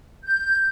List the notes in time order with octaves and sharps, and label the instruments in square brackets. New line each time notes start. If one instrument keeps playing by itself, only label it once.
[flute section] G6